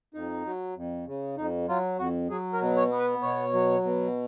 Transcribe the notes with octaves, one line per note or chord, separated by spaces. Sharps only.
F2 D#4
F#3
F2
C#3
F2 D#4
F#3 F4
F2 F#4
F#3 G#4
A#4
B2
C#5
B3
B4
B2 C#5
F#3
B2